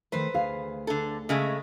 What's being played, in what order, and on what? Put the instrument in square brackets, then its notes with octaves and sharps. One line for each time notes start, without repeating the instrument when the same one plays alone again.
[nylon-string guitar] D#3 A3 [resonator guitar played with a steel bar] B4 C5
[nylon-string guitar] D2 G#4 F5
[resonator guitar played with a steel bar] D3 A4
C#3 G#3 A3